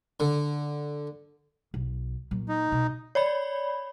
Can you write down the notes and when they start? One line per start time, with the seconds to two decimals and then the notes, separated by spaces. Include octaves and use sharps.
0.20 D3
1.74 B1
2.31 A#2 F#3
2.49 D#4
2.72 B2
3.15 C#5 D5 B5